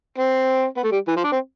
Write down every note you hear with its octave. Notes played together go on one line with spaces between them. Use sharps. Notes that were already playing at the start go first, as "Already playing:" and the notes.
C4
B3
A3
G3
E3
F3
D4
C4